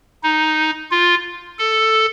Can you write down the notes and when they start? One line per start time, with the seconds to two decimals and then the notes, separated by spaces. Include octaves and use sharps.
0.23 D#4
0.91 F4
1.59 A4